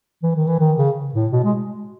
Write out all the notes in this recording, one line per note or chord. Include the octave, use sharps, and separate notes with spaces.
E3
D#3
E3
D#3
C#3
A2
B2
G#3